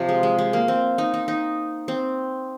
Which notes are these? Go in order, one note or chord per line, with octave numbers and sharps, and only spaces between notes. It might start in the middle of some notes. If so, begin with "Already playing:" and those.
Already playing: C3 F3
G#3
G#3
G#3
A#3
C4
D#4
D#4
D#4
C4